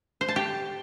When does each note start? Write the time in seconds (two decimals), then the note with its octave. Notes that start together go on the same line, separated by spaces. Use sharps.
0.21 C5
0.28 A5
0.36 G4